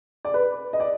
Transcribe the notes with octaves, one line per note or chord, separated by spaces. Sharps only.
D5
B4
D#5
D5